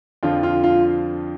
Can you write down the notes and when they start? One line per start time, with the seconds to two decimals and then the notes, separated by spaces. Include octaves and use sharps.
0.23 F2 D3 F3 F4
0.43 F4
0.64 F4